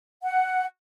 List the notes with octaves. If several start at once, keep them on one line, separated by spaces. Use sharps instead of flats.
F#5